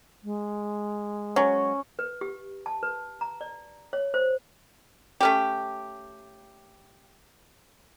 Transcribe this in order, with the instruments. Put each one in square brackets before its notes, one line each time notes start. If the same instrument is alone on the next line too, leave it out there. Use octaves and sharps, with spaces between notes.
[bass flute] G#3
[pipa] F#3 [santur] C#4 C#5
[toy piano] B4
G4
A5
B4
A#5
D5
C#5
C5
[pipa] A3 C#4 G4